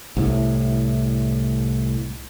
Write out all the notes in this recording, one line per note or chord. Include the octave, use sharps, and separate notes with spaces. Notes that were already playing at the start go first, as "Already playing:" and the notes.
C2 A2